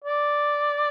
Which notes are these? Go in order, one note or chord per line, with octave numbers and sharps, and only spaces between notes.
D5